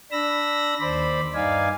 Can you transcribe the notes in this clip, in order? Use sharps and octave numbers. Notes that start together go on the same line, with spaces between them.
D4 B5 E6 A#6
D#2 C5 D5 B5
G2 D#4 D5 F5 G#5